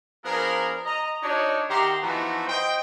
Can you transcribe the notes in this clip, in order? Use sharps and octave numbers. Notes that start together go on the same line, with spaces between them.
F3 B3 D4 G#4 A#4
D#5 A#5
D4 D#4 F#4 C#5
D#3 G4 E5 F#5 A#5 C6
E3 F3 A3 B3 D#4 F#4
C5 D#5 G5